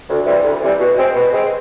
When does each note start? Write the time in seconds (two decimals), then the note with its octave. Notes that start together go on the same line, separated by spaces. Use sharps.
0.09 D2
0.26 C3 E3 G3
0.44 D2
0.62 C3 E3 G3
0.79 B2
0.97 G#3 C4
1.15 B2
1.32 G#3 C4